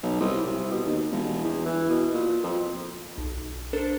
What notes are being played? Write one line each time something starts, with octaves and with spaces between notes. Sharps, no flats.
B1
C2
C3
B2
D#2
E1
E2
E3
B2
A#2
F2
B1
D4 A4 A#4 C5